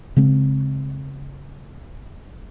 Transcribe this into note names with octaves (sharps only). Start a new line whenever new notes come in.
C#3 G#3 C4